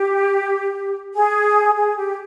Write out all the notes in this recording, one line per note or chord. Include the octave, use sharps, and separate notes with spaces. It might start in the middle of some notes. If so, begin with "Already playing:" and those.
Already playing: G4
G#4
G#4
G4